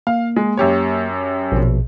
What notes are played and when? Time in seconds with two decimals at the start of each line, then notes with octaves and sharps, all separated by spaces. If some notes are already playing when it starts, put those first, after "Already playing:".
0.07 A#3 F5
0.36 G#3
0.57 F#2 G4 C#5
1.52 A#1 B2